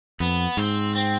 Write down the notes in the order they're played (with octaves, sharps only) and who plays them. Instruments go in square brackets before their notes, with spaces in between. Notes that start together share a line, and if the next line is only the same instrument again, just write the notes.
[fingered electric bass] F2 [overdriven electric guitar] B3
[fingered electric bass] G#2 [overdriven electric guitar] C4
[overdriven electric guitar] C4